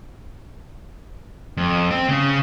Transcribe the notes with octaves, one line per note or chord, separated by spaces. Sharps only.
F2
C4
C#3